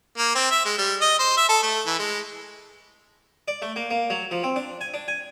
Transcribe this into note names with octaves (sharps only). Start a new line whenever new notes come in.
A#3
C4
E5
G#3
G3
D#5
C5
E5
A4
A3
E3
G#3
D5
A3
A#3
A#3
F#3
F3
C4
D4
G#5
D4
G#5